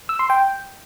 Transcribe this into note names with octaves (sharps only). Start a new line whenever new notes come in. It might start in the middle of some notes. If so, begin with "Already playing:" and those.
E6
C6
G5